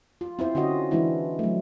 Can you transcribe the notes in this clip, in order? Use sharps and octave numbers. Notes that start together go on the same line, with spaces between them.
F4
C4 E4 C5
D3 C#4 F4 F#4 D#5
E3 G#3 D4 E4
F#3 A3